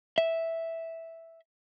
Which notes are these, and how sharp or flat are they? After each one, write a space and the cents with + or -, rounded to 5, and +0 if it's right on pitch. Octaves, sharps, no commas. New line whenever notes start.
E5 -5